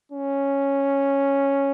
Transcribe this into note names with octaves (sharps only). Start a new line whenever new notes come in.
C#4